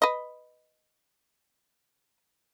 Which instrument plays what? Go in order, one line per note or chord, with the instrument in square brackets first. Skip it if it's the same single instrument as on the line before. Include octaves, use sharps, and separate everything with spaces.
[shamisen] B4 D#5